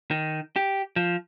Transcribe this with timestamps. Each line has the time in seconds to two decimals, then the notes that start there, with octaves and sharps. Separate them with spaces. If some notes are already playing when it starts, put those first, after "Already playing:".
0.11 D#3
0.56 G4
0.96 F3